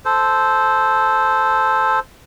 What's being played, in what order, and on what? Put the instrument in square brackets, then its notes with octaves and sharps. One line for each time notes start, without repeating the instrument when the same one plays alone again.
[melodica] A4 C5